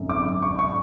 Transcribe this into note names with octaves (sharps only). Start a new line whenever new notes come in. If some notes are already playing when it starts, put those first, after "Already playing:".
Already playing: G#1 F#2 D3
D6
C#6
C#6